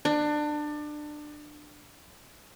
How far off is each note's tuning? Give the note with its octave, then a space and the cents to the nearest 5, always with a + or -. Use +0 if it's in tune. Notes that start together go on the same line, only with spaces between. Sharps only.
D4 +25